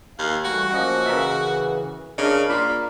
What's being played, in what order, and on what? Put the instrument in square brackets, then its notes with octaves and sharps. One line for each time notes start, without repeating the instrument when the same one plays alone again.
[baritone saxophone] D#2 [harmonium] F5
[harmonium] E3 G3 A3 [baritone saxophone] F#4
[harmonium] F3 A#3 C#4 [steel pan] D#5 F#5
[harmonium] C#3 E3 [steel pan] A#4 D#5 E5
[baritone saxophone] C#3 [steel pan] D4 D#5 [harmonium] A#4
[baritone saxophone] A#3 [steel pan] F4 D5 B5